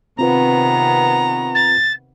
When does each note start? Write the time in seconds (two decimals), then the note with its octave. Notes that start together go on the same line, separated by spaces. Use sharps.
0.19 C3 D#3 B3 C4 F4 B4 A#5
1.55 A6